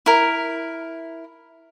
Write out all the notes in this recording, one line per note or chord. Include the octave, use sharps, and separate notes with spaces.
E4 A#4